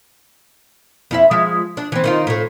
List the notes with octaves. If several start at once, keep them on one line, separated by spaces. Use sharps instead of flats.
F2 E4 E5
F3 G#3 E5
D4
E3 C4
D#3 D#4 F4
A2 A3